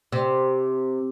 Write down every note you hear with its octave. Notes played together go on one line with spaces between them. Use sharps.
C3